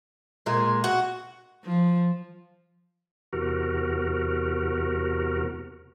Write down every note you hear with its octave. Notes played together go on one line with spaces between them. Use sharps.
A#2 G#3
F#4
F3
E2 C3 F#4 A#4